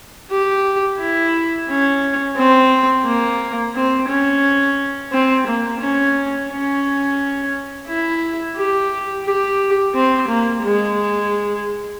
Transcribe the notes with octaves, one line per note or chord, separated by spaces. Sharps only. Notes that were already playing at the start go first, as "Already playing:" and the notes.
G4
E4
C#4
C4
A#3
C4
C#4
C4
A#3
C#4
C#4
E4
G4
G4
C4
A#3
G#3